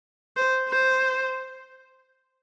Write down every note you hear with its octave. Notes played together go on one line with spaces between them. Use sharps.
C5
C5